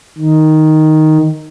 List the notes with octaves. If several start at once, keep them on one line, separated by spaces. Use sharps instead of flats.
D#3